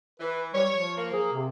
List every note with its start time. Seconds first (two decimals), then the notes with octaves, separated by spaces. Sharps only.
0.20 E3 B4
0.54 G3 C#5
0.72 F3
0.97 A#3
1.13 G#4
1.33 C3